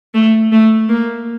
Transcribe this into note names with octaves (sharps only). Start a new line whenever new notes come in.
A3
A3
A#3